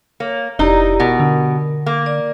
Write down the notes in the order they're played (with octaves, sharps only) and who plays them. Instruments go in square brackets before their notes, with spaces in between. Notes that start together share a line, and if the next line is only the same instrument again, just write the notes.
[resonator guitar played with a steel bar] A#3 [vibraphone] C#5
[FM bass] F1 [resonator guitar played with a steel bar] D#4 [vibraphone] E4 G4 D5
[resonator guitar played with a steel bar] B2 [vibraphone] A#4
[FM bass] D3
[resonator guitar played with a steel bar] A#3
[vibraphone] D5